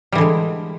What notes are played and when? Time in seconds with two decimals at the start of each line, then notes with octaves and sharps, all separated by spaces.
0.12 G3
0.15 E3
0.18 D3
0.21 G#3